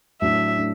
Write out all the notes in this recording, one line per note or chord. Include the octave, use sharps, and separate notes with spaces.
A2 F#3 A3 D4 E5
A3 D4